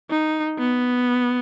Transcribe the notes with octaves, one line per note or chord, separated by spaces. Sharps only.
D#4
B3